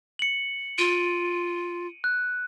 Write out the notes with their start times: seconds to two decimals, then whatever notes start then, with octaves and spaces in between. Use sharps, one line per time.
0.19 C#7 F#7
0.78 F4 D7 D#7
2.04 F#6